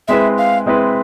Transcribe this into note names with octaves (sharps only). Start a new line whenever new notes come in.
G#3 C4 E4 G#4 B4 E5
F5
G#3 C4 E4 G#4 B4